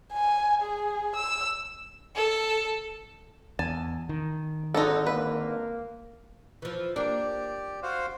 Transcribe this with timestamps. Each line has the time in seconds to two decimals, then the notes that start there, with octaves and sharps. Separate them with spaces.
0.13 G#5
0.62 G#4
1.16 E6
2.16 A4
3.59 E2 G#5 A5
4.09 D#3
4.74 G#1 D3 D#4 F#4 A4
5.06 A#3 B4
6.62 E3 F3
6.96 A#3 D4 G4 D5
7.82 F#4 C5 F5